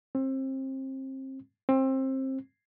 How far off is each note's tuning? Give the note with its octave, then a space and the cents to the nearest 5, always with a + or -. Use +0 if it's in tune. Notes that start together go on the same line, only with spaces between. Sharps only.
C4 +30
C4 +25